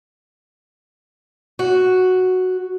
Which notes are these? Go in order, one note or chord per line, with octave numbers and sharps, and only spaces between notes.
F#4